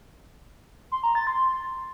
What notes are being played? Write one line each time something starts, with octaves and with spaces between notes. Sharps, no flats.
C6
A#5
A6
C6